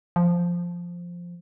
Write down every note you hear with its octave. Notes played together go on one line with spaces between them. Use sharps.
F3